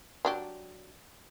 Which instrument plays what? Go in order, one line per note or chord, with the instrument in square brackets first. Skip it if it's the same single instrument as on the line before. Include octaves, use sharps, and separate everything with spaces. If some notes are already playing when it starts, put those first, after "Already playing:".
[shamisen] F#3 D4 G4